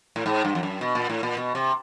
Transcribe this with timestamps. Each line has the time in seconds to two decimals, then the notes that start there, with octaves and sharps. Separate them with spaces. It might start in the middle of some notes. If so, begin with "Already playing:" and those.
0.16 A2
0.26 G#2
0.45 G2
0.55 F2
0.63 F#2
0.81 B2
0.95 A#2
1.10 A2
1.23 A#2
1.37 B2
1.55 C3